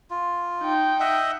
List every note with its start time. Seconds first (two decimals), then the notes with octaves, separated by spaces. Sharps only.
0.10 F4
0.61 D#4 G5
1.00 D#5 E5 F#5